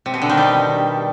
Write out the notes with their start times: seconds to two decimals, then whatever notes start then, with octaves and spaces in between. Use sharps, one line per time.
0.06 C3
0.14 B2
0.22 D3
0.30 D#3
0.37 G3